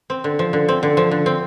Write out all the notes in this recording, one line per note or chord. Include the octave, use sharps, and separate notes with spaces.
C4
D3
F3
D3
C4
D3
F3
D3
C4